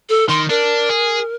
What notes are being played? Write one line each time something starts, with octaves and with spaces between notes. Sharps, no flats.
A4
D#3 C6
D4 A#4
G#4